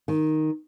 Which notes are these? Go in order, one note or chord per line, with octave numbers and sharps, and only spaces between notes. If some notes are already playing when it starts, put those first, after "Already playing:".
D#3